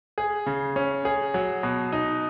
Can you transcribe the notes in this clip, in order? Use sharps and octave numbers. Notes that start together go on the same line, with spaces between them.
G#4
C#3
C#4
G#4
F#3
B2
D#4